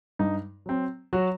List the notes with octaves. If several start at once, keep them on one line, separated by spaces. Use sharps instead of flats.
G2 D#4
F#3 C4
F#3 F#4